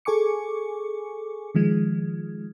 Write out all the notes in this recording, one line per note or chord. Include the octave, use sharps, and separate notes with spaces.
G#4 A4 G#5 C#6 D6 C#7
D#3 F3 G#3